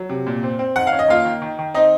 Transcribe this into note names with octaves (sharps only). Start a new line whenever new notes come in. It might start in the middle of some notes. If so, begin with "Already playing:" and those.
Already playing: F#3
C3
A#2
C4
C4
D#3 F#5
F5
C#4
D#5
A#3 F4 F5
D#3
D#3
D#3
C4 D#4 D#5